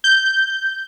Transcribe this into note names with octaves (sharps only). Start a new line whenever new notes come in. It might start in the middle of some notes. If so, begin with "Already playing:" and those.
G6